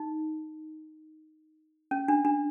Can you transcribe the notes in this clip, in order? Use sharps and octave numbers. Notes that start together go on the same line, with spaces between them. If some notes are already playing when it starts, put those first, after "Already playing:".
Already playing: D#4
C#4
D4
D4